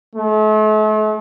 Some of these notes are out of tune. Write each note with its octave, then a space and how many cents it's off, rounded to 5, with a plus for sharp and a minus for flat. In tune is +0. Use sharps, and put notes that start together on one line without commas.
A3 -40